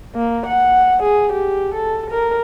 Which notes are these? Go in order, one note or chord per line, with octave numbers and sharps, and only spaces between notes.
A#3
F#5
G#4
G4
A4
A#4